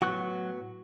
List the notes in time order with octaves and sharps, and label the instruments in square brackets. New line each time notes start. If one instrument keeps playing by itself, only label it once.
[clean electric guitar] A2 B3 F#4 [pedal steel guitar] F#3 C#6 F#6